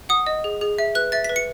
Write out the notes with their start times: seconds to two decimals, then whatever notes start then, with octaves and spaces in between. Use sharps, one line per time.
0.09 F#5 D#6
0.27 D#5
0.44 G#4
0.61 G#4
0.78 E5
0.95 B4 F#6
1.12 E5 A6
1.24 B6
1.29 B4
1.36 C#7